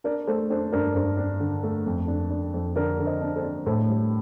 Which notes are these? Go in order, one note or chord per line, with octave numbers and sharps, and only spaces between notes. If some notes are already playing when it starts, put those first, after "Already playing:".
D4 A#4 D5
A3 A4 C5
D4 A4 C5
G2 A#4 D5
G2 A4 C5
D4
D3
A3
F2
D4
D4
F2
D3 A#4 D5
D3
C5 D#5
D4
A4 C5
D4
A2 A4 C5
G3